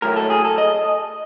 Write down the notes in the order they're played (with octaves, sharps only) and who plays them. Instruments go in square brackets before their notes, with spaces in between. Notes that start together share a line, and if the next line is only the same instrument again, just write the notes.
[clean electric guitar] A2 F#3 A3 A#4
A4
G#4
A4
D#5